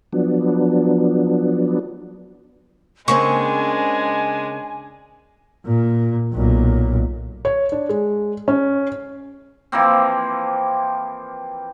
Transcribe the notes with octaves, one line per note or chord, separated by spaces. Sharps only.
F3 F#3 B3 D4
C#3 G#3 A#3 C4 D4 G#5 C#6
A#2
B1 A#2
C#5
D4
G#3
C#4
E3 F3 A#3 C4